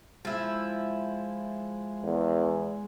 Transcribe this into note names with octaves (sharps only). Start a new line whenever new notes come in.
F3 G#3 E4
E2